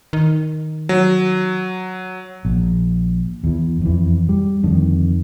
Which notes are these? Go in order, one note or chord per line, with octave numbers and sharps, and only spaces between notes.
D#3
F#3
A#1
E2 E3
F2 E3
G3
F2 D3 D#3